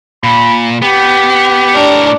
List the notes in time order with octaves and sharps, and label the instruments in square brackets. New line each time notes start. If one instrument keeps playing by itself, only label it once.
[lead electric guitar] A#2 [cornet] B5
[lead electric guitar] B3 [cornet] G4
[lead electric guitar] A2 A#4 [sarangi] D4